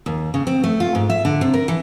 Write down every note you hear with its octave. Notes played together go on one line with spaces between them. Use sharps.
D#2
C#3
C4
A3
F4
G#2
E5
D3
C3
A#4
E3